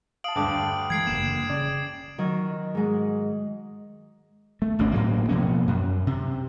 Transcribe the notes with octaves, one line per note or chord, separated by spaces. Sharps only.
F5 A5 D#6 D7 F#7
D2 G2 D3 G5 D6
E3 G#3 G#6 C7 D7
F#1 E2 A#3 E7
C#3 D5
D#3 F#3
G#2 G#3
A3
G#1 D2 B2 C#4
A2 F#3 A#3
B2 F3 A#3 C#4
F#2
C3